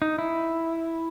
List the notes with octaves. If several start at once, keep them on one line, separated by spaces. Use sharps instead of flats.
D#4
E4